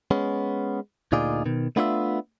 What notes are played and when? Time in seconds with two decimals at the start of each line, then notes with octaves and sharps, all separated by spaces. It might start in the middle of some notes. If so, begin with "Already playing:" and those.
0.11 G#3 B3 C#4
1.12 D2 A#2 D#4 F4 G#4 D5
1.46 B2 D#3
1.76 A3 B3 D4 F4 C#5 E5